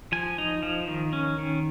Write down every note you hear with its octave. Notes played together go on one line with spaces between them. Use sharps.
F3 G#5
D#4
F3
D#3
C#4
D#3